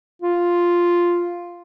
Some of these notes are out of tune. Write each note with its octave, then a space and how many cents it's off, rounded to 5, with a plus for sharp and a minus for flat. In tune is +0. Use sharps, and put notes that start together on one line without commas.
F4 +0